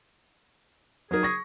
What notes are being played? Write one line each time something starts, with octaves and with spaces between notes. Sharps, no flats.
F#3 D#4 G#4 A#4
C#6 A#6